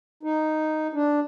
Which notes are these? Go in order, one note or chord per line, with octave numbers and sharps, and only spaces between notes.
D#4
D4